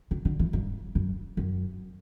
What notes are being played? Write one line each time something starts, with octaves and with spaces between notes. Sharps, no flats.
C#3
D3
E3
G2
F#2
F#2